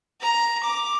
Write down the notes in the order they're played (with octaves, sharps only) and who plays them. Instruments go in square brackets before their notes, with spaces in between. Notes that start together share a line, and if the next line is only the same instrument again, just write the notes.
[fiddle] A#5
D6